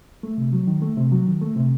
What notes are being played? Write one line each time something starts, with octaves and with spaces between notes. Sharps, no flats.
A3
C3
F#3
D#3
A3
C3
F#3
D#3
A3
C3